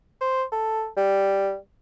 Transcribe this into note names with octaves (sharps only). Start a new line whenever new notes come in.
C5
A4
G3